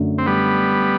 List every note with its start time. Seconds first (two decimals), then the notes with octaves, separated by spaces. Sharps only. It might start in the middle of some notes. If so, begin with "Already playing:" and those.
Already playing: F#2 D3 A3
0.18 C4
0.26 G3 B3